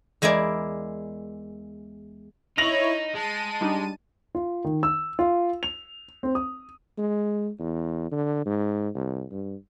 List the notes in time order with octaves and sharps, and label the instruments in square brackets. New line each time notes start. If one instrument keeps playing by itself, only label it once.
[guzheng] E2 G#3 E4 A#4 D5
[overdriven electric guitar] D#4 [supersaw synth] E4 C#5 [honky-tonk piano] A#6 F7 F#7
[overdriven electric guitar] G#3 [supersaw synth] A5 D#7
[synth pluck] G3 D4 D#4
[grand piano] F4
D#3
E6
F4
F7
C4
D#6
[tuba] G#3
E2
D3
G#2
C2
G2